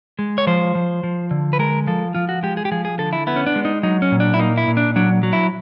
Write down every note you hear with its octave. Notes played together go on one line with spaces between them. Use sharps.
G#3
C#5
F3 C5
F3
F3
D3
B4
G#3 A#4
F3 A4
F3 F4
F#4
G#3 G4
G#4
G4
F3 G#4
G#4
D3 A4
E4
B3 E4
C#4
D4
G#3
D#4
F#3 D#4
C#4
A#2
D4
E4
A#3 D#4
E4
A#2
D4
F#3 D4
F#3
E4